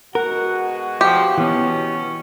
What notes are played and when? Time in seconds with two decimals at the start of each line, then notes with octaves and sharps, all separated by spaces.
0.15 B2 G#3 F#4 A#4 F#5
1.01 F3 G4
1.38 B2 E3 B3 C#4